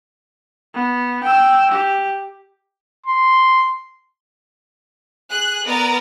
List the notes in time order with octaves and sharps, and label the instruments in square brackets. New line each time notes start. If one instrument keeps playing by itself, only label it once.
[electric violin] B3
G5 E6
G4
[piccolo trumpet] C6
[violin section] G#4 F#6
B3 A#4 D5 A#5 D#6 A6